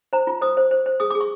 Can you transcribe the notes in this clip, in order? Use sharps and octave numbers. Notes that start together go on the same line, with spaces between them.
C5 A#5
F4
C5 D#6
C5
C5
C5
G#4 D#6
D6
G#4
C#6